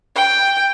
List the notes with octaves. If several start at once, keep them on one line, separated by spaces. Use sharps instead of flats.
G5